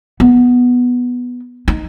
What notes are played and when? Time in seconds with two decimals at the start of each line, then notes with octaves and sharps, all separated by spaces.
0.20 B3
1.68 D#4